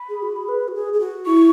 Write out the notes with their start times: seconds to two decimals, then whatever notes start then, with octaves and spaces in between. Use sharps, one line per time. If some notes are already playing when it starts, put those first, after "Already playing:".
Already playing: B5
0.09 G#4
0.22 F#4
0.36 G#4
0.48 B4
0.68 F#4
0.75 G#4
0.93 G#4
1.00 F#4
1.26 E4 C#6